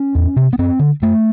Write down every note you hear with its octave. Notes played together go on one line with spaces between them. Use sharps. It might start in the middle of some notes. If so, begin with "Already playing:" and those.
Already playing: C#4
E2
C3
B3
F#2 C4
D3
F#2 A3